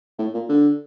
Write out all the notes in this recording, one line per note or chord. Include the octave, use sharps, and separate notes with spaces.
A2
A#2
D3